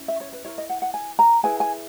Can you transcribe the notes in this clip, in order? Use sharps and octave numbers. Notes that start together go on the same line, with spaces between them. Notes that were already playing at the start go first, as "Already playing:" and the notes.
Already playing: C#4 E4
E5
C#5
B4
E4 A#4 C#5
D#5
F#5
F#5
G#5
A#5
E4 G#4 B4 G#5
G#5